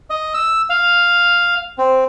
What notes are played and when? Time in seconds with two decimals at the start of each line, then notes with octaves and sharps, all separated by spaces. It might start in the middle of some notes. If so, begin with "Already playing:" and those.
0.10 D#5
0.34 E6
0.70 F5
1.78 C4